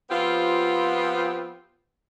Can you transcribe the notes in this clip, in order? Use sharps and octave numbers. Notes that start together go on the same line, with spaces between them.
F3 B3 C4 F4 G4